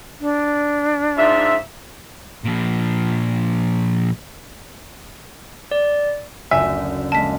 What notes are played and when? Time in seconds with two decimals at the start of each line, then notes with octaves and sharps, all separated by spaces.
0.20 D4
1.17 G#2 F4 E5
2.44 A#2 F3
5.71 D5
6.51 F#1 D2 E5 G#5
7.12 G#3 A#3 A5 B6